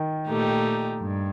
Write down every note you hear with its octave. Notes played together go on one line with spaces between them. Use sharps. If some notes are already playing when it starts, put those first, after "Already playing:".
Already playing: D#3
A#2 A3 D#4 G4
G2